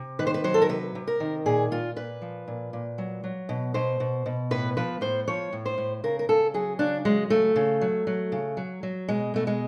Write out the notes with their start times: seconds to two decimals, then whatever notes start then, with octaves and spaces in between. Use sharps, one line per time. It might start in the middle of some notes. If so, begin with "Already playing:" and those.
Already playing: C3
0.19 D#3 B4
0.27 C5
0.34 B4
0.44 F#3 C5
0.54 A4
0.62 A#4
0.69 C3 B4
0.95 C3
1.07 A#4
1.20 D#3
1.46 A#2 G#4
1.71 A#2 F4
1.96 A#2 B4
2.22 F3
2.48 A#2
2.73 A#2
2.98 F#3
3.24 F#3
3.49 B2
3.74 B2 C5
4.00 B2
4.26 B2
4.51 A2 B4
4.77 F3 B4
5.01 A2 C5
5.27 F3 C#5
5.53 A2
5.66 C5
5.78 A2
6.04 C#3 A#4
6.19 A#4
6.29 C#3 A4
6.54 F#3 G#4
6.79 C#3 D4
7.05 F#3 G#3
7.30 C#3 A3
7.56 C#3
7.81 F#3
8.07 F#3
8.32 C#3
8.57 F#3
8.83 F#3
9.08 B2 G#3
9.34 B2 A3
9.47 G#3